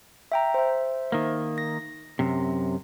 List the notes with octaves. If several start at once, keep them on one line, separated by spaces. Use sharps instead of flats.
E5 G5 A#5
C5 E5
D#3 A#3
A#6
F#2 C3